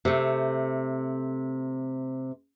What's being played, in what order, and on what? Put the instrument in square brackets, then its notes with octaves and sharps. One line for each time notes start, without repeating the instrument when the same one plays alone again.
[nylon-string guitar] C3 A3